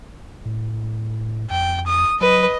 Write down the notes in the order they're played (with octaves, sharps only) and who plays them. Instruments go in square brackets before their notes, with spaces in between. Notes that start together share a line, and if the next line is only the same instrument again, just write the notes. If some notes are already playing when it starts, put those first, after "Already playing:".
[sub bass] A2
[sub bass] F2 [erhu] G5
[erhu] D#6
[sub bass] F#3 [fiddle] B4 [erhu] D#5